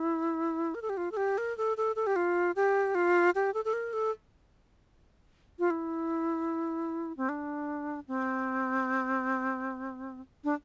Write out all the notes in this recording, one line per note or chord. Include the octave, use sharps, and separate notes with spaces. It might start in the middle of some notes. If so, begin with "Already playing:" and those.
Already playing: E4
A#4
A4
G4
F4
A4
G4
A#4
A4
A4
A4
G4
F4
G4
F4
G4
A4
A4
A#4
A4
F4
E4
C4
D4
C4
D4